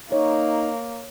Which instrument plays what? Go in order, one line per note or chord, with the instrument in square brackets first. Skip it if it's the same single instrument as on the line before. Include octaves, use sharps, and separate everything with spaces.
[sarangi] A#3 [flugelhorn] D#4 [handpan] C#5